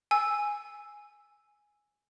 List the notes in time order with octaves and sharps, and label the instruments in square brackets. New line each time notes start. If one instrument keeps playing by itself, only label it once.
[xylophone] G#5 E6